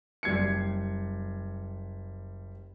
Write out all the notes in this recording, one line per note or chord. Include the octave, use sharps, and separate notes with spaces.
F#1 G3 G#6 C7 C#7